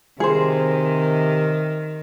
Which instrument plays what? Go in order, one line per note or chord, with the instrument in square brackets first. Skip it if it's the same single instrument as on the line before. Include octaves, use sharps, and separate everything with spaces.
[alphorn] C3 [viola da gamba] D#3 [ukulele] G#4 C5